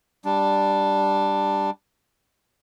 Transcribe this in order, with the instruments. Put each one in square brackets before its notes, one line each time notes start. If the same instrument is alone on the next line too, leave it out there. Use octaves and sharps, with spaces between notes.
[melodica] G3 D4